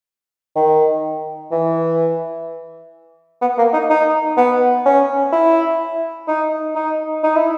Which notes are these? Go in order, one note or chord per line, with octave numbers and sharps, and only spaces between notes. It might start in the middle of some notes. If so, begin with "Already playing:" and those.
D#3
E3
B3
A#3
D#4
D#4
B3
C#4
E4
D#4
D#4
D#4
E4